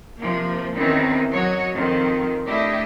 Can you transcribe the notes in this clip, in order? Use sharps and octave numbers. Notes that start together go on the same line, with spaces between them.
C3 F3 A#3
E2 D#3 E3 C4 C#4
F#3 F#4 C#5 D#5
F2 D#3 F3 C4
A3 D4 E4 G4 D#5